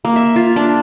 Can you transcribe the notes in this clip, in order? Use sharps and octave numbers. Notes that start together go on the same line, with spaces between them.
A#3
E5
F4
D4